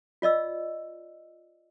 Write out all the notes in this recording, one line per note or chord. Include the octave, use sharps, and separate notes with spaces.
F4 D5 D#5 E6